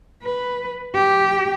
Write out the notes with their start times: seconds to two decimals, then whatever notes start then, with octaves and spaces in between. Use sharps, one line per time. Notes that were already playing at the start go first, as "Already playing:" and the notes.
0.24 B4
0.95 G4